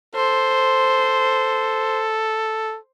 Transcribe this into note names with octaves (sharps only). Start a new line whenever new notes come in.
A4 C5